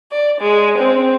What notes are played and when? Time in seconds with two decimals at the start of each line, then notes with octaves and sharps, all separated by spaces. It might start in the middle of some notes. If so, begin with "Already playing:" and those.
0.11 D5
0.40 G#3
0.78 C4